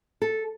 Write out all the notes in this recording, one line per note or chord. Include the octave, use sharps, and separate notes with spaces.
A4